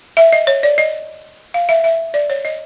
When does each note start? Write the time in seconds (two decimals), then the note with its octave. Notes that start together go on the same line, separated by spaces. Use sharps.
0.17 E5
0.33 D#5
0.47 C#5
0.63 D5
0.78 D#5
1.54 F5
1.69 E5
1.84 E5
2.14 D5
2.30 C#5
2.45 D#5